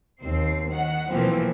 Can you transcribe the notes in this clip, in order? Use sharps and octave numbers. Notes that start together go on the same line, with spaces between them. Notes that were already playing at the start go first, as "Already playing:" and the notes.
D#2 C4 C7
D#3 F#5
B1 A#2 E3 F3 A#3 C4